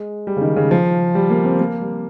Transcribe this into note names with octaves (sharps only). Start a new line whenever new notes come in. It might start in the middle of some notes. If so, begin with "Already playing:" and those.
Already playing: G#3
G3
C#3
D#3
C#3
F3
G3
A#3
C4
A#3
G3